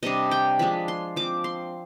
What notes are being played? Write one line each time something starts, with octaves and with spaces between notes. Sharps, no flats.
C3 G3 D4 D#5
G5
F3 G#3 D4 B5
C6
F3 C4 D6
C6